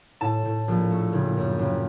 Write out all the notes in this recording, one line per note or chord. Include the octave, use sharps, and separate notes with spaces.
A2 A5
A2
A#1
A3
F#1
F#2
F#1